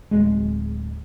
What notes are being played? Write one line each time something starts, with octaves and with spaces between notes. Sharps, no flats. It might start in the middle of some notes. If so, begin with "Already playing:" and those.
D1 G#3